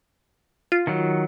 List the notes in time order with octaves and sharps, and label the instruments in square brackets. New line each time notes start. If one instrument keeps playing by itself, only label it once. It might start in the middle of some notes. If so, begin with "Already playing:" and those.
[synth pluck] F4
[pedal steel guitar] D#3 F#3